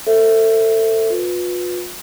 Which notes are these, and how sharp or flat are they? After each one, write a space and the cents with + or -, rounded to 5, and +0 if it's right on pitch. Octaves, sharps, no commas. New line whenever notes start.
A4 +25 C5 +0 E5 +0
F4 +35 B4 +0